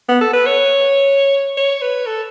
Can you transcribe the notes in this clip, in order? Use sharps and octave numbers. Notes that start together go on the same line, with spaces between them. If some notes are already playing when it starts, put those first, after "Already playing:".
B3
A4
B4
C#5
C#5
B4
A4